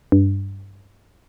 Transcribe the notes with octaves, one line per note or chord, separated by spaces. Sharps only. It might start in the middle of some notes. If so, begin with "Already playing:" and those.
G2